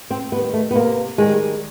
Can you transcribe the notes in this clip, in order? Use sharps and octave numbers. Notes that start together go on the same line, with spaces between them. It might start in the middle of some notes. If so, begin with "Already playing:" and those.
C4
D#3 G3 B3
A3
B3
C3 A#3
D#3 G3 G#3